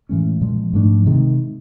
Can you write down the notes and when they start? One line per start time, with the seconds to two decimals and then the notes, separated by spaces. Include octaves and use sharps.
0.09 A2 E3 G#3 C#4
0.41 A#2 F3 G#3
0.73 G#2 F3 A3 D4
1.06 C3 D#3 G#3